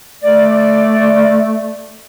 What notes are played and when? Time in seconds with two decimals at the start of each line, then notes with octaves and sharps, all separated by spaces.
0.24 A3 D5